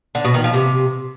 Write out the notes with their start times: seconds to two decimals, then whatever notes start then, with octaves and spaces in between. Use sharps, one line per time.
0.15 D3
0.25 B2
0.34 D#3
0.44 F3
0.54 C3